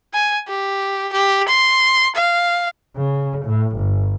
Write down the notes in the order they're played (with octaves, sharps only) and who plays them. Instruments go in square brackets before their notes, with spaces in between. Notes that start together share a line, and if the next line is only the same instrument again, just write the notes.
[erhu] G#5
G4
G4
C6
F5
[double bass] C#3
A2
G1